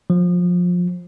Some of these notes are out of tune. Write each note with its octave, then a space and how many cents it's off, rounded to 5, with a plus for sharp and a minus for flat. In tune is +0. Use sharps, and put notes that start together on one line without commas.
F3 +25